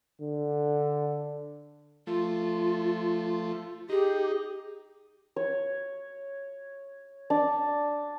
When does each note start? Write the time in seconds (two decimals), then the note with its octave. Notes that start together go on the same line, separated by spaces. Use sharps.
0.21 D3
2.07 F3 A3 F4
3.89 D#4 G4 G#4
5.36 C#5
7.30 D4